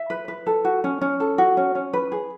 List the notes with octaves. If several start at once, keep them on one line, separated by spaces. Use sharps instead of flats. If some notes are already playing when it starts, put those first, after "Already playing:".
Already playing: E5
B4
B4
A4
F#4
C#4
C#4
A4
F#4
C#4
C#4
B4
G#4